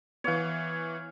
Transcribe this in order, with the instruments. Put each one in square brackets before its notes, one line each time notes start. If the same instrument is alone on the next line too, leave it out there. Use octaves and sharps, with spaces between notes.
[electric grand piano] E3 B3 [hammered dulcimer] C#5 F5